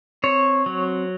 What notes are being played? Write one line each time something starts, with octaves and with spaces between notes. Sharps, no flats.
C4 C#5
F#3